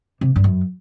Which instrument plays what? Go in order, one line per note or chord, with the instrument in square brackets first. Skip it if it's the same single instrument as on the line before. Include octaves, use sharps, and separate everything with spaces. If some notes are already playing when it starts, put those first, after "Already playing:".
[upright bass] C3
G2
F#2